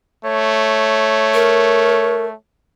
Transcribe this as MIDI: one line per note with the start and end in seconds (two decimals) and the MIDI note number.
0.25 2.34 57
0.25 2.35 73
1.34 2.25 70